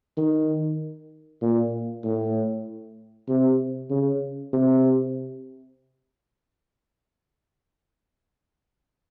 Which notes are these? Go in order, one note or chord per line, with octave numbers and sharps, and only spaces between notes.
D#3
A#2
A2
C3
C#3
C3